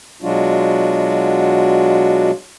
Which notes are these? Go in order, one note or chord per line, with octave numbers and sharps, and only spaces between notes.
B2 F#3 G#3 D4 F4 F#4